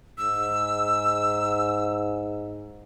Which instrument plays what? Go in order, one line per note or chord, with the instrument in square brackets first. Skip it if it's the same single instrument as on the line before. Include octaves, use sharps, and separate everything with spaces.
[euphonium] G#2 [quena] E6